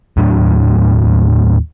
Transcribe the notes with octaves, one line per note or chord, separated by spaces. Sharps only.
D#2 A2 F#3 D4